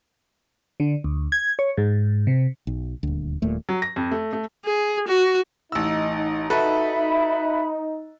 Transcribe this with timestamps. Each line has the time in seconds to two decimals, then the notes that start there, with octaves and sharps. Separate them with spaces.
0.80 D3
1.04 D2
1.32 G#6
1.59 C#5
1.77 G#2
2.27 C3
2.67 B1
3.03 D#1 D2
3.42 D#1 D#2 A#2 A3
3.69 F#3
3.82 A#6
3.96 F2
4.11 A3
4.33 A3
4.65 G#4
5.08 F#4
5.72 A1 D#4 E6
6.50 F#4 A4 B4 E5 B5